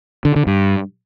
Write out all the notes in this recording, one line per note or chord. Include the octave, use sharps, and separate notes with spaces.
D3
D3
G2